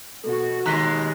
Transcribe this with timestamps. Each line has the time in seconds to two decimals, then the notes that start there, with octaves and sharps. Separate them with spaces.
0.24 B2 F#4 A4
0.66 D#2 G#3 A#5 F#6 B6